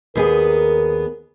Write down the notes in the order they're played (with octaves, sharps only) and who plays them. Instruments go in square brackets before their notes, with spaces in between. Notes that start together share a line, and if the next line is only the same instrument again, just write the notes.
[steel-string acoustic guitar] D#2 B3 G#4 [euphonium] A#4